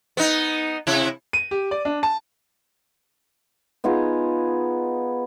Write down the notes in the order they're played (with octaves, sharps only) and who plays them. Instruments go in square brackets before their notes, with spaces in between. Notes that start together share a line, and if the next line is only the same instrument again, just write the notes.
[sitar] B3 D#4
C3 E4
[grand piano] D#7
G4
D5
D4
A5
[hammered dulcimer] B3 D#4 F4 G#4